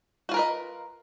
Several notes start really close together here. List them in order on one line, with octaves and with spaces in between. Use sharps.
F#4 F4 A#4 B4 D#5